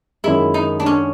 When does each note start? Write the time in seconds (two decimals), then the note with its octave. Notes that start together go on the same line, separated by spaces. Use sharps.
0.24 F#2 D#3 G#3 E4
0.54 D#4
0.80 D4
0.86 C#4